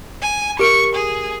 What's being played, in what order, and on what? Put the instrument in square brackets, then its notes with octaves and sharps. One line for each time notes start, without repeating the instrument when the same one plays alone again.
[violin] G#5
[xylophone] G4 A#4 D7 [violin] C#6
[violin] G#4